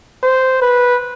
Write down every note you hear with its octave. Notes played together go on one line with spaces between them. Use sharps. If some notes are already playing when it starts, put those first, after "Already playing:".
C5
B4